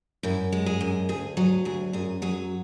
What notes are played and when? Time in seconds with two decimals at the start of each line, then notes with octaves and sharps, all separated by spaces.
0.23 F#2 E4
0.52 G#3
0.66 G#4
0.81 F#2
1.09 D2 G#4
1.37 F#3 G#4
1.65 D2 G#4
1.93 F#2 G#4
2.22 F#3 G#4